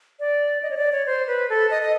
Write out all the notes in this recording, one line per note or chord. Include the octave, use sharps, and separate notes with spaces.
D5
D#5
C#5
D5
C#5
C5
B4
A4
D#5
D#5